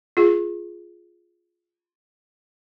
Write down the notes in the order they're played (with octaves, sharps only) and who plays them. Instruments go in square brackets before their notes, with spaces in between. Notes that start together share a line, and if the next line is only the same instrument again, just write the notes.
[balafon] F4 G#4